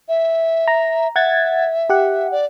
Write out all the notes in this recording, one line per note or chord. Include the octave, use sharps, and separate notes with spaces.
E5
A#5
E5 F#5 G#6 A6
G4 F#5
D5